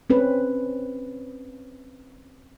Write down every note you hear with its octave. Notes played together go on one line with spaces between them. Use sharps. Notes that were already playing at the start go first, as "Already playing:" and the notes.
C4 C#4 B4